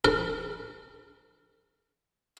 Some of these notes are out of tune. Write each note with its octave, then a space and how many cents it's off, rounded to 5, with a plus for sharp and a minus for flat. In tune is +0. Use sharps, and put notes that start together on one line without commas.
A#4 -40